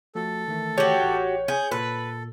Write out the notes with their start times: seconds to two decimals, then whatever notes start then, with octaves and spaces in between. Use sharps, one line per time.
0.15 F3 A3 F#4 A4
0.48 D#3 E3 A3
0.78 F#4 G4 C#5
0.99 A1 F#6 G6
1.48 G#4 G6
1.71 A#2 A4 B4